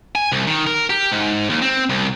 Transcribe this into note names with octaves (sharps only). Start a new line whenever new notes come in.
G#5
C2
D#3
A#4
G4
G#2
D#2
C4
C2